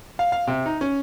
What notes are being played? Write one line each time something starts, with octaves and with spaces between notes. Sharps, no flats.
F5
F5
C3
D#4
C#4